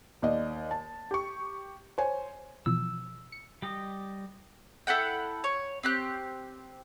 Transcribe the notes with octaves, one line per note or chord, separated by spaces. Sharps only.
D#2 D5 D#5
A5
G4 C#6
C5 C#5 G#5
B2 E3 F3 E6
C#7
G3 G4 D#5
E4 A4 F#5 G5
C#5
C4 G4 F#6